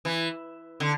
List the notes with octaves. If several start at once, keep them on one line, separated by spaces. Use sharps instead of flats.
E3
D3